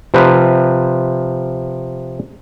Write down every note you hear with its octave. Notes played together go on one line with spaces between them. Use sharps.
C3 F3 B4